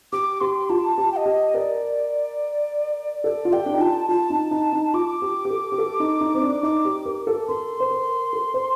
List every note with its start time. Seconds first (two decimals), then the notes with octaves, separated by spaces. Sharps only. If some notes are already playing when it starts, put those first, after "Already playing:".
0.12 G4 D6
0.40 G4 C6
0.69 F4 A5
0.98 G4
1.12 G5
1.16 D#5
1.26 G4
1.54 A#4 D5
3.24 A4 D5
3.45 F4
3.52 G4 G5
3.66 D4
3.73 D#4
3.80 F4 A5
4.09 F4 A5
4.30 D#4
4.51 D#4
4.73 D#4
4.94 F4 D6
5.22 G4
5.45 G4
5.50 A4
5.72 G4
5.78 A4
6.00 D#4
6.21 D#4
6.34 C4
6.42 D4
6.63 D#4 D6
6.85 G4
7.06 A#4
7.27 A4
7.48 A#4 C6
7.80 C5
7.91 A#4
8.33 A4
8.54 C5